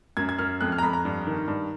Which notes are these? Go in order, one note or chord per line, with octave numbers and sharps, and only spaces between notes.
F#2 G#6
G#6
F#2 F6
F2 F#6
F6
A#5
F2 B5
A#5
G2
D#3
G2